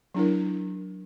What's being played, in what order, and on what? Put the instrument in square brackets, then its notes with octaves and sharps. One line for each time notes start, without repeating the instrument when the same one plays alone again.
[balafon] F#3 D4 E4 A#4